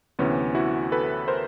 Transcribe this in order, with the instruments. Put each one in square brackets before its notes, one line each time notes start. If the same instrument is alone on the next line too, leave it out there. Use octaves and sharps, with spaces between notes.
[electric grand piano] D2 C3 E3 B3 C#4
E4 F#4
A4 B4
A#4 C5